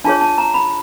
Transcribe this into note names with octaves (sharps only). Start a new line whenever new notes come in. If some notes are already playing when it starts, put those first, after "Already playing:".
D4 F4 G#4 C#5 A5
A5
A#5
B5